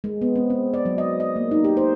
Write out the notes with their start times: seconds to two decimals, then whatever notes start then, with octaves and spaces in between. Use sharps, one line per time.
0.04 G#3
0.22 B3
0.36 C4
0.50 C4
0.74 D5
0.86 F#3
0.98 D#5
1.20 D#5
1.36 A#3
1.51 D#4
1.64 G4
1.77 C5